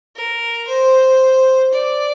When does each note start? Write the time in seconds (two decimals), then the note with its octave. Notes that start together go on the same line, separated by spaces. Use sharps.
0.16 A#4
0.68 C5
1.73 D5